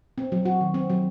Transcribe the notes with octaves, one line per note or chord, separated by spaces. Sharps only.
C4
F#3
F#4
D#3
C4
F#3